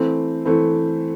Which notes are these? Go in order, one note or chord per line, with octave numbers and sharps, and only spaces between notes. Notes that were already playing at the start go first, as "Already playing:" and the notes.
Already playing: E3 A3 C4
E3 A3 C4